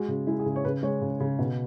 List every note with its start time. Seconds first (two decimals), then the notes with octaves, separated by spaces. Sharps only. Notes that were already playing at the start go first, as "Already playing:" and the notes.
Already playing: G#3 F#4
0.08 C#3
0.27 G#3 E4
0.40 G#4
0.46 C#3
0.56 C#5
0.65 C#3 B4
0.83 G#3 C#5
1.01 C#3
1.20 C#3
1.39 B2